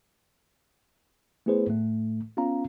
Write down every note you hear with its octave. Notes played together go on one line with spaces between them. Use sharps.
A3 B3 E4 G#4 B4 C5
A2 A3
B3 C#4 F4 F5 A#5